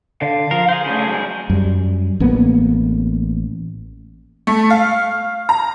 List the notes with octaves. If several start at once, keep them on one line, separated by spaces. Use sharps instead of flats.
D3 F5
F3 A#4
G#4 C5
C#3 A3
G#2 F#3
F#2 G3
A1 A#3 B3
A3
F5
A#5